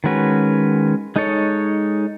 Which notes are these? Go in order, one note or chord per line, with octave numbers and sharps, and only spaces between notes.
D#3 G#3 C#4 F#4 B4
G#3 D#4 A4 C#5